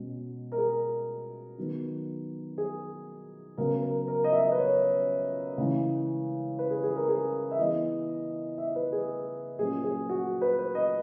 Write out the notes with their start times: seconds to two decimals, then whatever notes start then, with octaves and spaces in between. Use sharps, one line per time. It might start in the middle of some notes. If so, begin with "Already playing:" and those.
Already playing: B2 G#3 C#4
0.52 A#4
0.58 G#4
1.58 D#3 F#3 B3
2.58 G#4
3.57 C#3 F#3 B3 A#4
3.83 A#4
4.08 A#4
4.24 D#5
4.33 E5
4.41 D#5
4.52 B4
4.58 C#5
5.58 C#3 E3 G#3
6.59 B4
6.70 G#4
6.83 G#4
6.96 A#4
7.08 G#4
7.51 E5
7.59 E3 B3 D#5
8.58 E5
8.75 B4
8.92 G#4
9.59 A#2 F#3 C#4 G#4
9.84 G#4
10.09 F#4
10.41 B4
10.59 B4
10.75 D#5